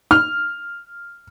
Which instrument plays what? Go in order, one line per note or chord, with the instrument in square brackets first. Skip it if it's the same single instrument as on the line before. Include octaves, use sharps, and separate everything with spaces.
[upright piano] F6